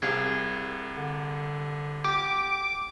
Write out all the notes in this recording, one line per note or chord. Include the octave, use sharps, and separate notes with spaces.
C2 C3 G#4 F5
D3
G4 D6